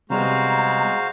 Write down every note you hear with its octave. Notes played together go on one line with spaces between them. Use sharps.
C3 G3 G#3 B3 F#4 C5 F5 A#5